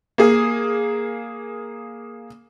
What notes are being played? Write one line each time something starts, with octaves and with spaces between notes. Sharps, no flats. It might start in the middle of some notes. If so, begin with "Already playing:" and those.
A#3 G#4